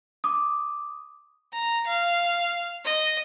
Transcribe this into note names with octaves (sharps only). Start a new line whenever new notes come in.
D6 D#6
A#5
F5
D#5